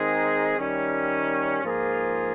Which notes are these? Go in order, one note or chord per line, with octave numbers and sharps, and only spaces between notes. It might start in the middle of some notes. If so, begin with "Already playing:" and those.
Already playing: D#3 G#3 C4 D#4 G#4
D#3 G3 C#4
G#2 F3 A#3 F4 G#4